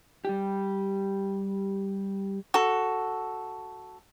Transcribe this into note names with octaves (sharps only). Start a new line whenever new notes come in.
G3 G4
F#4 A4